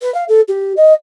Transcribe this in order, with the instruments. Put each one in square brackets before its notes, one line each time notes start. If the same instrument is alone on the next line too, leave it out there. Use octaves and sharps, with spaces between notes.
[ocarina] B4
F5
A4
G4
D#5